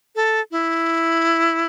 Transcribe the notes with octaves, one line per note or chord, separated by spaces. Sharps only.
A4
E4